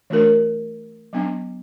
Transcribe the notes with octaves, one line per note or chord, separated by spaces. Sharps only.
E3 A3 D4 F#4 A#4
F#3 B3 D4